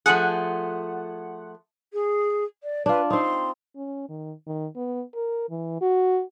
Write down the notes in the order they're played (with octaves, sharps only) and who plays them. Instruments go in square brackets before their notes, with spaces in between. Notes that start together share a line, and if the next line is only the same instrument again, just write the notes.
[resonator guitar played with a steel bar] F3 A3 G#4 [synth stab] F#5
[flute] G#4
D5
[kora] D4 F4 [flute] B4
[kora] C4 D#4 [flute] C6
[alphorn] C#4
D#3
D#3
B3
A#4
E3
F#4